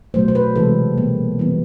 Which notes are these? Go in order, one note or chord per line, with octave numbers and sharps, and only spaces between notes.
B2 F#3 A3 C5
C5
B4
C3 E3 G#3 C4 A4
B2 G3 A#3
E3 G3 B3